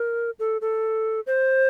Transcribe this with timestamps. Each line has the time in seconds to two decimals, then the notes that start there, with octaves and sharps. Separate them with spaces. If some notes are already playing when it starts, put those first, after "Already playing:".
Already playing: A#4
0.39 A4
0.61 A4
1.27 C5